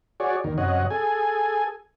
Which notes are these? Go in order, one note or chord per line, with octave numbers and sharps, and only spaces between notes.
F#4 G#4 C#5 D5
D#2 D#3
F#2 C3 C#5 D#5 F#5
G#4 A4 G#5